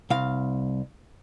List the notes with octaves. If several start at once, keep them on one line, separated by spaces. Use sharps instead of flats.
C2 F5